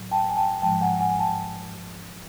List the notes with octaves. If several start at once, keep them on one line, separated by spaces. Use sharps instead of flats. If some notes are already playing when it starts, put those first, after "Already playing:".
Already playing: A2 F#3
G5 A5
G#5
G5 A5
G#2 F3 G#3 G5 A5
F#5 G#5
F#5 G#5
G#5
G5 A5